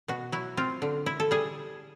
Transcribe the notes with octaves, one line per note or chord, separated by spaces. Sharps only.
B2 F#4
F#3 E4
C4 F4
D3
E4
A4
G3 G#4